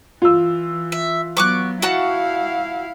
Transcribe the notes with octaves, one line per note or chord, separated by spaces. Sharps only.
E3 F4 E6
E5
F#3 B3 C#6 D6 F#6
E4 F#4 F5 F#5 A5